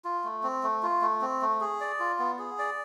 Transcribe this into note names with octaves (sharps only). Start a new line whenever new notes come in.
F4
A3
C4
A3
F4
A3
C4
A3
G#4
D5
F4
B3
G#4
D5